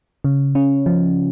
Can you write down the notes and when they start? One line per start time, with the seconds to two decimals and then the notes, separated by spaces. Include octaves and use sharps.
0.24 C#3
0.55 C#4
0.86 F3